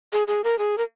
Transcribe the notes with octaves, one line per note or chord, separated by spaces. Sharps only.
G#4
G#4
A#4
G#4
A#4